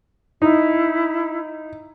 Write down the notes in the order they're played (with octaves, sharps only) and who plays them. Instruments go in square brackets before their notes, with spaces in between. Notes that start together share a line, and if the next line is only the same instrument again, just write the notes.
[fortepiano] D#4 [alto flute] E4